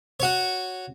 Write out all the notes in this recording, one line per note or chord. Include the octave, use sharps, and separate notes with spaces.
F#4 C#5